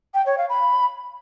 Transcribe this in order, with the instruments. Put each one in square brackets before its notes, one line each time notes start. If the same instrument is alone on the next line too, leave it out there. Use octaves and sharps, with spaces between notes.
[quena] G5
C#5
F5
B5